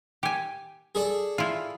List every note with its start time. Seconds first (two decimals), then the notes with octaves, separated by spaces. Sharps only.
0.23 G4 G#5
0.95 G#4 A4 D5
1.38 E4 F4